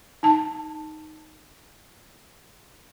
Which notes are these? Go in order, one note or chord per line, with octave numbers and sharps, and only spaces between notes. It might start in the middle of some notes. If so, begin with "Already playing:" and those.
D#4 A5